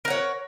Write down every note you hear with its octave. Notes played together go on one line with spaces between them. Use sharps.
A#4 C#5 F#5